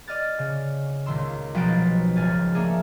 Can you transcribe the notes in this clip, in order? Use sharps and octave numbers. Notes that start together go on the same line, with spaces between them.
D5 D#5 F6 A6
C#3
C#2 A#2 D#3 C6 E6
B1 F3 F#3 D#4 A6 D7
G#1 C#2 G#5 F6 A6
A3 A#3 D4 G#4 A#4